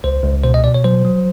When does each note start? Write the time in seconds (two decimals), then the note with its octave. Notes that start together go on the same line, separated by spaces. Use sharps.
0.04 C#2 C5
0.24 C#2
0.44 B2 C5
0.54 D#5
0.64 B2 D5
0.74 C#5
0.84 F#3 C5
1.05 F#3